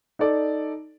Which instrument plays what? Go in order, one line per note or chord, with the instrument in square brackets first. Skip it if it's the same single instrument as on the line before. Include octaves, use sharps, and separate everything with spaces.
[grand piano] D#4 A4 D5